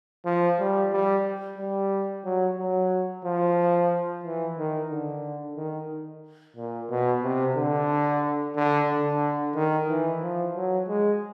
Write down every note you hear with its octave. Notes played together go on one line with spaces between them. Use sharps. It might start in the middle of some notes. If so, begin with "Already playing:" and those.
F3
G3
G3
G3
F#3
F#3
F3
E3
D#3
D3
D#3
A#2
B2
C3
D3
D3
D3
D#3
E3
F3
F#3
G#3